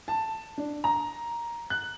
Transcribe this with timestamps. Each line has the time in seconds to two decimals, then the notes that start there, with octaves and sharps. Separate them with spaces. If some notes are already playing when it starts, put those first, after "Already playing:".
0.08 A5
0.58 D4
0.84 A#5
1.70 F#6